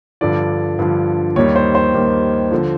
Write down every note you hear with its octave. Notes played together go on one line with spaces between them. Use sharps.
G2 D3 F3 D5
G2 D3 F3
D#2 D#3 G3 C#5
C5
C5
D#2 D#3 G3
D3 F3